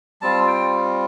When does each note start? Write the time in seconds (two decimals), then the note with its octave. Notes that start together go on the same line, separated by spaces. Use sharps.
0.22 G3 C4 F4 A5
0.48 G5